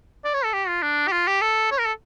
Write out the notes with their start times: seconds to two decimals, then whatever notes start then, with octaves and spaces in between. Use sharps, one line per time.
0.24 D5
0.34 C#5
0.44 A4
0.53 G4
0.68 F4
0.82 D4
1.07 G4
1.12 F4
1.27 G4
1.41 A4
1.71 C#5
1.79 A#4
1.85 A4